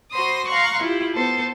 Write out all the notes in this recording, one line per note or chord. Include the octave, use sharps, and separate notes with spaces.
F#4 C5 B5 C6 D#6 A#6
F5 A#5 C6 C#6 F#6
E4 F4 G4
B3 A4 C5